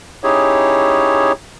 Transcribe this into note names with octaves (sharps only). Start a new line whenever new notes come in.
C#4 D#4 E4 G4 G#4 C#5